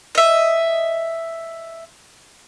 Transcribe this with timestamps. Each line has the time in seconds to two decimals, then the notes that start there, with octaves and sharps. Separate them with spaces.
0.15 D#5 E5